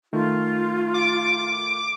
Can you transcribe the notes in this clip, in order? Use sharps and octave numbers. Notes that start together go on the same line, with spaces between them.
D#3 A3 F4
D6